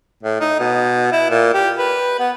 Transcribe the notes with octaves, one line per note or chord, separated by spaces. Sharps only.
A2
D#4
B2
E4
A#2
G4
B4
B3